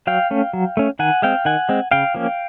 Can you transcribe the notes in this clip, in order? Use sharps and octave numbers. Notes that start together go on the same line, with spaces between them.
F#3 F5 G5
A3 C#4
F#3
A3 C#4
D#3 F#5 G#5
G#3 C4 F5 G5
D#3 F#5 G#5
G#3 C4
C#3 F5 G5
F3 A#3 C#4